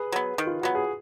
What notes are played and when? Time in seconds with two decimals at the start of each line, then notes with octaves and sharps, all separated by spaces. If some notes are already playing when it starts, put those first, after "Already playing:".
Already playing: G#4 B4
0.12 F#3 B3
0.38 D#3
0.47 F4
0.61 F#3 B3 F#4
0.75 G#4